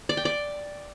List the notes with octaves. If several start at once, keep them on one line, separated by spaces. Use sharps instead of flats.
D5
G5
D5